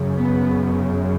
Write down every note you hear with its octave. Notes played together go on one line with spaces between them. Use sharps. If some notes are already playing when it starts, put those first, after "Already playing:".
Already playing: F#2 C#3
B3